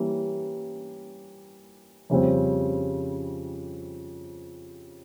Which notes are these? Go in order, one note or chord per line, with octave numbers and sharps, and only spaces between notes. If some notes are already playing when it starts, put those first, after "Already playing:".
Already playing: E3 G3 A#3 C#4
F2 C#3 G3 C4